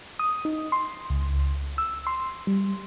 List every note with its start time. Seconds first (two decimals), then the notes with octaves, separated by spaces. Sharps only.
0.19 D#6
0.45 D#4
0.72 C6
1.10 C#2
1.78 E6
2.07 C6
2.47 G3